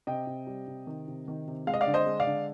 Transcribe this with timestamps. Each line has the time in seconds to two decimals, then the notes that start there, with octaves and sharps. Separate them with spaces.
0.07 C3 D#5 G5
0.27 C3
0.47 G3
0.67 C3
0.87 D#3
1.08 C3
1.28 D#3
1.47 C3
1.67 G#3 F5
1.74 D#5
1.81 D5 F5
1.87 D3
1.94 C5 D#5
2.06 G#3
2.20 D5 F5
2.27 D3